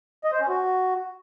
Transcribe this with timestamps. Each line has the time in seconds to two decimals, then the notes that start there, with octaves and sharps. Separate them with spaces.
0.24 D#5
0.32 C5
0.41 C#4
0.49 F#4